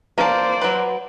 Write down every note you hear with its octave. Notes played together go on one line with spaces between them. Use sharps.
A#3 C5 D5 A5
F#3 B4